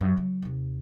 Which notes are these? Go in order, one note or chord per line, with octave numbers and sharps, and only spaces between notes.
F#2
C#3 F#3
D#2 C3